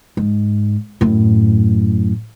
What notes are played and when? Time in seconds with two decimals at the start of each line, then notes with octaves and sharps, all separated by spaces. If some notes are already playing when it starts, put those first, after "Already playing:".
0.17 G#2
1.01 F#2 A2